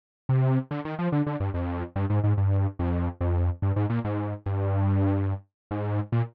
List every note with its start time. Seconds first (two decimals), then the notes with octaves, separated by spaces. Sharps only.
0.29 C3
0.71 D3
0.85 D#3
0.99 F3
1.12 D3
1.27 D3
1.40 G2
1.54 F2
1.96 G2
2.10 G#2
2.24 G#2
2.37 G2
2.79 F2
3.21 F2
3.62 G2
3.76 G#2
3.90 A#2
4.04 G#2
4.46 G2
5.71 G#2
6.12 A#2